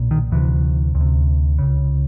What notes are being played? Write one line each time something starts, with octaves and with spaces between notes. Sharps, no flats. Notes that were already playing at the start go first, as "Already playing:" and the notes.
Already playing: B1 A#2
D#3
D2 C3 E3
D2
C3
C#2 C#3